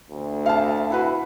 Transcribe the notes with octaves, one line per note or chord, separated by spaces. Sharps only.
D2
F5 A5
E4 F#4 B4